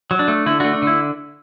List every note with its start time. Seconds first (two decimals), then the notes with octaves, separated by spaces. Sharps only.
0.11 F#3
0.19 D4
0.28 A3
0.46 D3 E4
0.60 D4 F#4
0.64 A3
0.73 D4
0.82 D3 E4